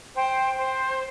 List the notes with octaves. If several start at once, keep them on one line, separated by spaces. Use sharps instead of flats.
C5 G5
C5